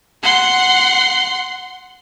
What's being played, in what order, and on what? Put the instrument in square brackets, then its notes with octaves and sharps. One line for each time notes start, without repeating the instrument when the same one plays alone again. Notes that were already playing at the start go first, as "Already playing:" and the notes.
[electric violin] F#5 C6